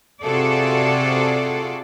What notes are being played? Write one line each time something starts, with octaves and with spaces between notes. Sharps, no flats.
C3 F4 F#4 G#4 A4 D5